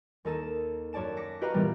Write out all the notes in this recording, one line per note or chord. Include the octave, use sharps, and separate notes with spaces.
D#2 D#4 A4 E7
F#2 C#5 D5 A5 E7
D6 A#6 B6 C#7
F#4 G4 B4 D#5 F5 A#5
A#2 E3 G3 B3